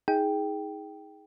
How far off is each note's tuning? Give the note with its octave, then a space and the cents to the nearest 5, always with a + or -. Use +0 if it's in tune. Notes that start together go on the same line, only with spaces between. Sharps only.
D#4 +30 G#4 +0 G5 +0